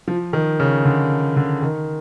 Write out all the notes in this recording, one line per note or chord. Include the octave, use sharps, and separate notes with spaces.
F3
D#3
C#3
D3
D3
D#3